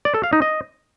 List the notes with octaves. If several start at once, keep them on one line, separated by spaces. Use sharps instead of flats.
D5
A4
F5
D#4
D#5